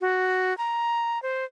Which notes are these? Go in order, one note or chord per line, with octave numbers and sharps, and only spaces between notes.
F#4
A#5
C5